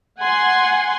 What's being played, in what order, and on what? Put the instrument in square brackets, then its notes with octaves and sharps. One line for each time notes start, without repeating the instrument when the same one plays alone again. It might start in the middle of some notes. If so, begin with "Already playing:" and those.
[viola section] F#5 G#5 C6